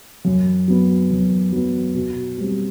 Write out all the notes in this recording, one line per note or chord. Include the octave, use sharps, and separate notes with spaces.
F#2
F#3 B3
F#2
F#3 B3
B2
G3 C4